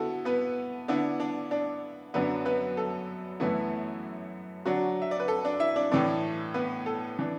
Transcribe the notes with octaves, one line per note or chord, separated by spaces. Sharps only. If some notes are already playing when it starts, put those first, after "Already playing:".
Already playing: D3 B3 E4 F#4 A4
B3 B4
D3 B3 D4 E4 D5
D4 D5
D4 D5
F#2 D3 F#3 B3 D4 B4
B3 B4
A4
F#2 E3 A3 B3 E4 B4
D3 F#3 D4 F#4
E5
D5
B4
A4
D4 D5
E4 E5
D4 D5
A2 E3 A3 D4 D5
B3 B4
A4
E3 D4